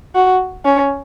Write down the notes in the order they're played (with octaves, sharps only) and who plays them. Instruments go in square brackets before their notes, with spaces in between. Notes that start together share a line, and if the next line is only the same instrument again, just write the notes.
[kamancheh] F#4
C#4